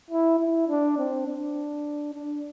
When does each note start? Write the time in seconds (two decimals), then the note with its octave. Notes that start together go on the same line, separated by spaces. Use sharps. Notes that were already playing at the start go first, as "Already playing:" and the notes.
0.10 E4
0.39 E4
0.69 D4
0.98 C4
1.27 D4
2.14 D4